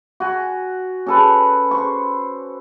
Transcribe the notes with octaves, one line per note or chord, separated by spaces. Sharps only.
F#4 G#5
C#4 A4 B4
C5 C#6